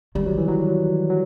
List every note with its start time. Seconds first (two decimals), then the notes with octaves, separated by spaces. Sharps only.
0.15 D#3 G3
0.26 F#3
0.38 E3
0.48 F#3
1.10 F#3